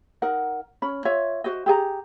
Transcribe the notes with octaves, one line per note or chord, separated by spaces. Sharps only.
D#4 A#4 F#5
C#4 B5
F4 C#5 E5
F#4 C5 D#5
G4 G#4 G#5 A#5